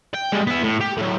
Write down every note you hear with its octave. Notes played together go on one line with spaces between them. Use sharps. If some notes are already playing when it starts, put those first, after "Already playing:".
G5
G3 G#3
B3 E4
A2
G4
A2 F#3